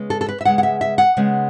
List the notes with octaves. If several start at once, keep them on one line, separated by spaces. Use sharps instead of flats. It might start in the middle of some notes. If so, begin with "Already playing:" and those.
Already playing: C#3 G#3 B3
A4
A4
B4
E5
C#3 G#3 B3 F#5
F#5
E5
E5
F#5
C#3 G#3 B3